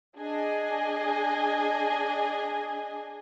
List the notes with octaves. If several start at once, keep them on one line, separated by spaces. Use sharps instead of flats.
D4 G#4 D#5 G#5